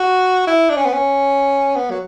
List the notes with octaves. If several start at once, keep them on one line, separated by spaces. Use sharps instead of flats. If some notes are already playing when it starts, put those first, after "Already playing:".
Already playing: F#4
E4
D4
C#4
B3
C#4
B3
F#3